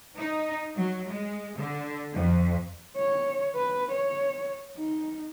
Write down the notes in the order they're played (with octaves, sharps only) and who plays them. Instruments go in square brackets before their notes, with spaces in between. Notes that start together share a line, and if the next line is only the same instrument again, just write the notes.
[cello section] D#4
F#3
G#3
D3
F2
[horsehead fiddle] C#5
B4
C#5
D#4